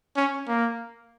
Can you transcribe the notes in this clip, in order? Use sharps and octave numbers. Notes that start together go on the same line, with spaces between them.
C#4
A#3